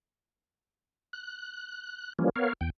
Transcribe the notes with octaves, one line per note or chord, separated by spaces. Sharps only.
F#6
E3 F3 G3 A#3 C#4
B3 A#4 C#5 F5
E2 G5